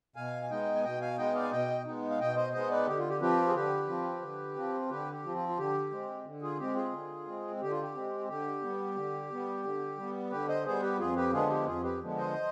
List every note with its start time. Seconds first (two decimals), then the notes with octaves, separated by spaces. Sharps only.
0.16 B2 F5 G#5
0.43 G#5
0.51 G#3 B3 D#4 D#5 G5
0.75 G#5
0.84 B2 D#5 G5
1.01 F5 G#5
1.18 G#3 B3 D#4 D#5 G5
1.35 D5 F5
1.43 G#5
1.51 B2 D#5 G5
1.85 G#3 B3 D#4
2.10 F5
2.20 B2 D#5 G5
2.36 C5 D#5
2.53 G#3 B3 D#4 C5 D#5
2.70 B4 D5
2.87 D3 G4
2.98 F4
3.09 G4
3.20 F3 C4 F4 G4 B4
3.48 G#4
3.54 D3 G4 B4
3.88 F3 C4 F4
4.22 D3
4.56 F3 C4 F4
4.90 D3 G4 B4
5.13 G4
5.24 F3 C4 F4
5.36 F4
5.49 F4
5.57 D3 G4
5.91 G#3 C4
6.25 D3
6.42 F4 G#4
6.59 G#3 C4 G4
6.76 F4 G#4
6.93 D3
7.27 G#3 C4
7.61 D3 G4
7.71 F4
7.82 G4
7.95 G#3 C4
8.28 D3 G4
8.62 G3 B3
8.95 D3
9.30 G3 B3
9.64 D3
9.97 G3 B3
10.31 D3 G4 B4
10.48 C5 D#5
10.65 G3 B3 G#4 C5
10.82 G4 B4
10.99 F2 F4 G#4
11.16 G4 B4
11.32 D3 F3 G#3 B3 F4 G#4
11.50 G4
11.66 F2 F4 G#4
11.83 G4 B4
12.01 D3 F3 G#3 B3
12.17 C5 D#5